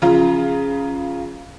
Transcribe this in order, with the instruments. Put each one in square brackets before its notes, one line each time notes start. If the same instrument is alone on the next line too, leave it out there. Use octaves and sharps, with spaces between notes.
[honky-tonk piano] C#3 F3 F4 A#5